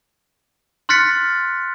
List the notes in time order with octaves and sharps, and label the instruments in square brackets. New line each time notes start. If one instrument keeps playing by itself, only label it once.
[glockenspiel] C6 F6 F#6 A6 B6 C#7